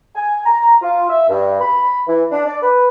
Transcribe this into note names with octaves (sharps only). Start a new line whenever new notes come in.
G#5
A#5
F4
E5
G2
B5
E3
D4
D5
B4